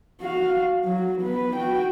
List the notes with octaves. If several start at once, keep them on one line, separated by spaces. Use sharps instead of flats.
F#4 F5
F#3 F#4
B3 B4
F#4 G5